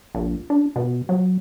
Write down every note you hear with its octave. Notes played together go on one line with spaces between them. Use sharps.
A#1
D4
B2
F#3